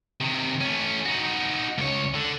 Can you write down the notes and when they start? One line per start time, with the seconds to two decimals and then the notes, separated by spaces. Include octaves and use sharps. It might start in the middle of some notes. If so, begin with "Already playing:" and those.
0.20 C3 D#3
0.61 A3 C#4
1.06 D#4 F#4
1.78 C#2 C#5
2.15 D3